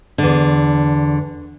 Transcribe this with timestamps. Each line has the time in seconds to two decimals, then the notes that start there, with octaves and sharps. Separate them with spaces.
0.18 E2 D3